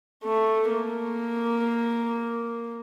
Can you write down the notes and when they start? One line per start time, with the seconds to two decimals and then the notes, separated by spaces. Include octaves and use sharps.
0.24 A3
0.70 A#3